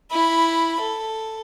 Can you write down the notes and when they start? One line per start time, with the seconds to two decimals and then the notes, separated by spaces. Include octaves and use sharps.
0.11 E4 B5
0.80 A4